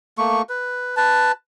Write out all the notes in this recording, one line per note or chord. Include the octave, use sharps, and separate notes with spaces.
A3 A#3 C#6
B4
B4 A5